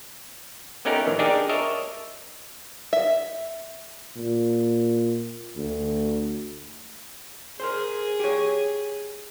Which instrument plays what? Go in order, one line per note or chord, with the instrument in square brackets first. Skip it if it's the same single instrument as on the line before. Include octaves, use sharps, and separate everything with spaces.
[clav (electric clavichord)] A3 B3 C#4 D#4 G4 A#4
A#1 D#3 E3
D4 D#4 G4 G#4 A#4 D5
A#4 C#5 D#5 E5 A5
[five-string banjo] E5
[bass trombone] A#2
D2
[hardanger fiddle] G#4 [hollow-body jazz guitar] A#4 C5
[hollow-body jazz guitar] G4 C#5